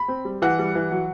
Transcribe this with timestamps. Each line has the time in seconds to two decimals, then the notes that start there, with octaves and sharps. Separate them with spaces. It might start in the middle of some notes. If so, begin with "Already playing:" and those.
Already playing: B5
0.08 C4
0.25 G3
0.42 E3 F#5
0.59 G3
0.75 E3
0.91 F#3